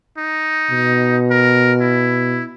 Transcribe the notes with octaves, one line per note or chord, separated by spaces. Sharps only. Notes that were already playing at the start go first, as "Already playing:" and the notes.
D#4
B2
A#4
E4